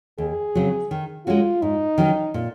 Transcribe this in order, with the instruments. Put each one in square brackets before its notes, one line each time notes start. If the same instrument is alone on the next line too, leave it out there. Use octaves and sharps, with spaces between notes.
[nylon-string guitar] D#2 [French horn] G#4
[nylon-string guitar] C#3 F#3 C4
D#3
[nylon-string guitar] G#3 C#4 F#4 [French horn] F4
[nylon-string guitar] G#2 [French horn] D#4
[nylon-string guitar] D#3 F#3 C#4
A#2